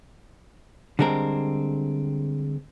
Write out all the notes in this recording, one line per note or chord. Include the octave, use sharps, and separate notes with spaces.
D3 G3 G#3 C4 A#4